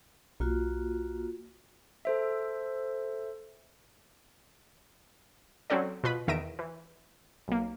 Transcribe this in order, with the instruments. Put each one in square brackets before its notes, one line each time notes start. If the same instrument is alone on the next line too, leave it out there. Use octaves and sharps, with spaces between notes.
[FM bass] B1 [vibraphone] A#3 F4 F#4
[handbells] A4 C5 E5
[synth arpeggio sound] F#3 C4 C#4 F#4 A4 D5
B2 F4 B4 B5
E2 D#3 E5 A#6 D7 E7
E3
B1 A#3